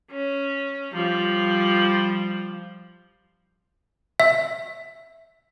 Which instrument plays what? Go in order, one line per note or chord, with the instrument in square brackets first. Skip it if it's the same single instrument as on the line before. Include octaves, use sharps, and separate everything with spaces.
[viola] C#4
F3 G3
[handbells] E5